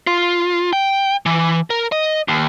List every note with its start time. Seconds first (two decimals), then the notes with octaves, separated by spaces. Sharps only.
0.07 F4
0.73 G5
1.26 E3
1.70 A#4
1.92 D#5
2.28 D#2